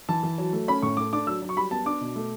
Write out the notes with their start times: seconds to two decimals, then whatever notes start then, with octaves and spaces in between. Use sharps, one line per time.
0.09 E3 A5
0.23 E3
0.38 F#3
0.53 A3
0.68 C#4 B5
0.82 A2 C#6
0.97 A3 D6
1.13 D4 D6
1.27 F#3 E6
1.42 F#3
1.49 C#6
1.57 G3 B5
1.71 B3 A5
1.86 D4 D6
2.01 B2
2.16 A3